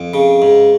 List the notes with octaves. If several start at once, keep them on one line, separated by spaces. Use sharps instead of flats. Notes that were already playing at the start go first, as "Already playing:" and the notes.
Already playing: F2
C#3
G#2